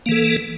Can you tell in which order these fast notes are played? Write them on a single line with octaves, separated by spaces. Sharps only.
A#3 E3 A4